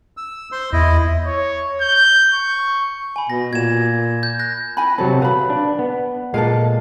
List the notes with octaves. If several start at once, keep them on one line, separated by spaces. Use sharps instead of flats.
E6
C5 C6
E2 E4 D#5
C#5
G6
C#6
G#5 B5
B2 A#6
A#2 G#6 E7
G6
F#6 A#6
E4 G#5 B5
C3 F#3 C4 A4
B4 F5 B5
D4
B3
A#2 G#3 A4 A#4 F5